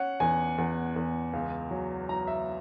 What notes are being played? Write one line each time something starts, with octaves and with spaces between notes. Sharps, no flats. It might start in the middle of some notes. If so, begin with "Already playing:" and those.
Already playing: C#4 F#5
E2 G#5
E2
E2
C#2
F#3
F#3 A#5
E5